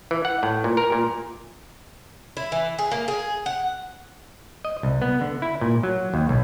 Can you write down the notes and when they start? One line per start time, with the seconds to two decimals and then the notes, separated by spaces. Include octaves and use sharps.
0.11 E3
0.25 F#5
0.43 A2
0.64 A#2
0.77 A#4
0.92 A#2
2.37 E4
2.52 E3
2.79 G#4
2.92 A#3
3.08 G#4
3.46 F#5
4.65 D#5
4.83 C2
5.02 B3
5.21 D3
5.42 E4
5.61 A#2
5.83 F#3
6.14 D#2
6.29 B1